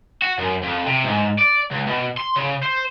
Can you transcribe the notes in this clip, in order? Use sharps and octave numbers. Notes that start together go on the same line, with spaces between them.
F#4
F#2
F2
C3
G#2
D5
C#2
B2
C6
C#3
C5